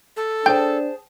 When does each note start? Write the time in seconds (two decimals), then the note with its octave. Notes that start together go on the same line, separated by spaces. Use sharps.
0.17 A4
0.46 D4 G#4 C5 G5 A5 G6